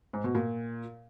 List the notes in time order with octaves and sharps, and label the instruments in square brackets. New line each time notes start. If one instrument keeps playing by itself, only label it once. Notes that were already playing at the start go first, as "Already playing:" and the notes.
[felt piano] G#2
B2
A#2